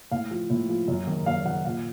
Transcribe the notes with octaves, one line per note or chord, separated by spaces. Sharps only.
A2 F5
F3
A2
F3
F#2
D#3
F#2 F5
D#3 F#5
A#2 F5